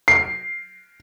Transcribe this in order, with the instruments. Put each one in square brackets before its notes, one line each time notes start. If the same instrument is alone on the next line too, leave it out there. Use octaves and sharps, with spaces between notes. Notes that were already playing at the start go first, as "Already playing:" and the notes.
[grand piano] C7